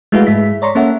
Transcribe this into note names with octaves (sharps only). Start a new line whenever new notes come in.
G#3 A3 E4 F#4 B4 F5
G#2 G#3 E5 B6
C#5 D5 A#5 C6 C#6
A#3 C#4 A4 E5 F#5